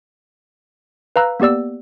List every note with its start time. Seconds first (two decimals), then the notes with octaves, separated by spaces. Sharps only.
1.16 B4 F5 A#5 E6 F#6
1.40 A#3 B3 G4 D5 E6